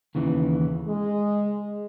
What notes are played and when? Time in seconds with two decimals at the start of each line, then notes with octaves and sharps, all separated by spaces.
0.15 D#2 C#3 E3
0.86 G#3